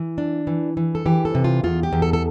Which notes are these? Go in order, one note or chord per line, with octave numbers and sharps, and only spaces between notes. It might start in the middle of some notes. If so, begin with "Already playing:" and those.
Already playing: E3
D4
E3
E3
A4
E3 G4
A4
C3
F4
E2 F4
G4
E2
A4
A4